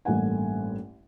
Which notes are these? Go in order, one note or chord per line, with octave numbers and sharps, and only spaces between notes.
A1 G2 A3 A#3 F#5 G#5